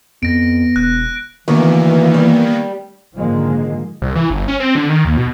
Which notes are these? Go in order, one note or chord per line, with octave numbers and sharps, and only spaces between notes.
F2 B3 A#6 D7
E1 F#6
D2 D#3 E3 A#3 B3
G3
G#2 D3 D#3 F3 G#3 A#3
C2
E3
G1
C#4
C4
D3
D#3
D#2
B2